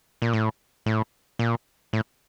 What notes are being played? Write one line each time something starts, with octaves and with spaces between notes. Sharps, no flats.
A#2
A2
A2
A#2
A2